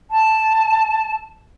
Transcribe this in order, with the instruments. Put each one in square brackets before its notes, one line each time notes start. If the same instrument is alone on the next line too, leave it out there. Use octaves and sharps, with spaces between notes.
[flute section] A5